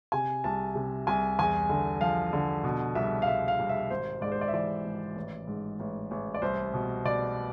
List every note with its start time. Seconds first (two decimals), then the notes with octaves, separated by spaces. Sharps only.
0.12 C3 G#5
0.44 C2 A5
0.75 C3
1.07 C2 G#5
1.39 E2 G#5
1.69 D3
2.01 F3 F5
2.33 D3
2.64 B2
2.95 C2 E5
3.22 F5
3.27 C2 E5
3.48 F5
3.59 C2
3.69 E5
3.90 G#1 C5
4.21 G#2 D5
4.32 C5
4.41 D5
4.48 E5
4.53 E3 D5
4.85 G#1
5.16 A1
5.47 G#2
5.80 A1
6.11 A1
6.35 D5
6.42 C2 C5
6.74 B2
7.05 B2 D5